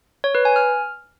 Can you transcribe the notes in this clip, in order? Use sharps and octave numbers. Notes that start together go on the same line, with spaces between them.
C#5
B4
G#5
F6